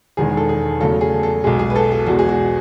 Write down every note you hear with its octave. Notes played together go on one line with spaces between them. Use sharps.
E1 E2 D#3 G#3 G#4
A4
G#4
E2 C#3 F#3 A3 A4
G#4
A4
B1 B2 G#3 G#4
G#4
B4
A4
G#4
E2 B2 G#3 F#4
G#4
F#4